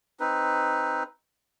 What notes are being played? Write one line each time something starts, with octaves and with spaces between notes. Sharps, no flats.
C4 D#4 B4